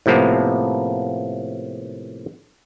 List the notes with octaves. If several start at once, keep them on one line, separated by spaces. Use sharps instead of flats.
A2 C3 F3 A#3 B3